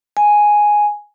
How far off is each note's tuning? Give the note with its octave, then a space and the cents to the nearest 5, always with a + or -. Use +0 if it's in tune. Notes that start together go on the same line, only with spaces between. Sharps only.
G#5 +0